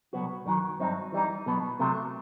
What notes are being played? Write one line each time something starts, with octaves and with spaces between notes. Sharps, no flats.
C2 B2 F#3 B3 F#4
F#2 D#3 F#3
G2 F#3 C4 D#4
E3 G3 D#4
B2 F#3 B3
C3 F#3 A3